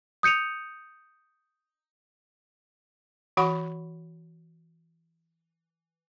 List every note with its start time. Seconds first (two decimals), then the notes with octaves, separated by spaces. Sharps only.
0.23 D#6 G6 C#7 D#7 F7
3.37 E3 F#4 F#5 B5 C#6